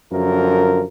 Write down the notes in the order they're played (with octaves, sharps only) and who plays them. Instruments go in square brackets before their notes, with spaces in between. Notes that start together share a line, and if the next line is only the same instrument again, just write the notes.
[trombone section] F#2 D3 F3 A#4